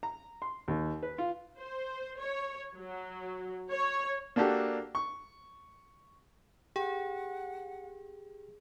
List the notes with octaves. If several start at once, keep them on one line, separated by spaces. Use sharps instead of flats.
A#5
C6
D#2
B4
F4
C5
C#5
F#3
C#5
A#3 D4 F#4 G4 A4
C#6
G4 G#4 F#5 G5